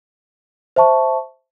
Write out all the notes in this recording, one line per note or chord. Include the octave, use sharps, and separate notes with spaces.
C5 E5 A5 C#6